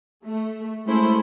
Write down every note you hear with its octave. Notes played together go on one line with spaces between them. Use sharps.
A3
G#3 A3 C#4 E4 C5